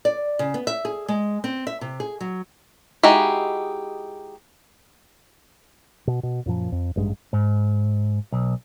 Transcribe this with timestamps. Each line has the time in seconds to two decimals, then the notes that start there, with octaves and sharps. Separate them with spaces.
0.05 D5
0.39 C#3
0.54 B3
0.67 E5
0.85 G#4
1.08 G#3
1.44 C4
1.67 E5
1.81 C3
2.00 G#4
2.21 F#3
3.03 G#3 D#4 E4 F#4 G4
6.07 B2
6.23 B2
6.46 F#2 A#2 F3
6.72 F2
6.96 A1 G2 G#3
7.33 G#2
8.32 B1